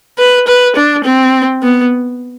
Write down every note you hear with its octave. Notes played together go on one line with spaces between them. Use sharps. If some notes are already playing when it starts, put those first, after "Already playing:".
B4
B4
D4
C4
B3